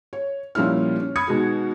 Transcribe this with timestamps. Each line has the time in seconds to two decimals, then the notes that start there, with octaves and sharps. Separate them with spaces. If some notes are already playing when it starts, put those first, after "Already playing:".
0.13 C#5
0.55 A#2 F3 G3 C#4 E4 F6
1.00 C#4
1.16 B5 D#6 G#6 C#7
1.27 B2 D#3 G#3 F#4 G#4